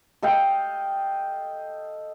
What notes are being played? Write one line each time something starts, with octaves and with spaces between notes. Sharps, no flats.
A4 D#5 F5 G5